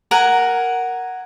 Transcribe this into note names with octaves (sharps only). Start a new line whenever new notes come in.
A#4 F#5 G#5